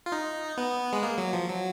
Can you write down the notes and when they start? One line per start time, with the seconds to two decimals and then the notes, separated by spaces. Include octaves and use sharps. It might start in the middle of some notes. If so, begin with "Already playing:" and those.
0.06 F4
0.12 D#4
0.57 B3
0.93 G#3
1.03 A#3
1.18 F#3
1.33 F3
1.48 F#3